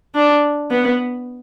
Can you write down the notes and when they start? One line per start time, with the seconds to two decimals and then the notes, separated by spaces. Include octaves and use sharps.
0.15 D4
0.71 B3